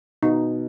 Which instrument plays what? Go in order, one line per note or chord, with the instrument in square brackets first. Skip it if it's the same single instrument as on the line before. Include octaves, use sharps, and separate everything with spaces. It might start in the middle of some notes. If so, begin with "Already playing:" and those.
[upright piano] B2 [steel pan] D#4